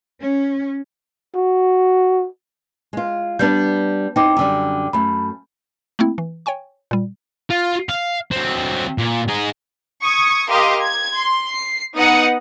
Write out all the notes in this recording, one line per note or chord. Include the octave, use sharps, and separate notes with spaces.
C#4
F#4
G#3 F4
G3 B3 D4 G6
C4 D#4 G5 D6
F#2 D3 G3
F#2 A3 B5
A3 A#3 C4 E4
E3
C#5 G5 G#5 C#6
A#2 G3
F4
F5
F#3 C4
A#2
D#4 G#4
C#6 D#6 G#6
G4 A#4 D#5 F5 C6 D#6
G#6
C6
C7
B3 D#4 D#5 F#5 D#6 C#7